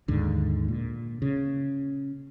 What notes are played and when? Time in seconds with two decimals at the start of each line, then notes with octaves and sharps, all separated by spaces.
0.08 D#2 G#2 D3
0.68 A#2
1.22 C#3